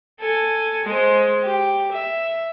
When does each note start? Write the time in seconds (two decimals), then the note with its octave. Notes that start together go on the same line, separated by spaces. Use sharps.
0.20 A4 G#5
0.85 G#3 C5
1.43 G4
1.92 E5